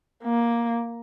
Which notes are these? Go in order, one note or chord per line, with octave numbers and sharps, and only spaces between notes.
A#3